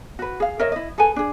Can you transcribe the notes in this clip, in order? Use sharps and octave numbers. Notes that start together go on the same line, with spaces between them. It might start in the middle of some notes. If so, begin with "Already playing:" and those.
F#4 B4
G#4 F5
A#4 C#5 D#5 E5
E4 D#5
G#4 A4 B4 G#5
D4 G#4